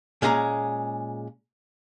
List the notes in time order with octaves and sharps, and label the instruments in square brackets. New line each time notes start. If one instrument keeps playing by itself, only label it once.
[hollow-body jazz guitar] A#2 G#3 C#4 G#4 A#5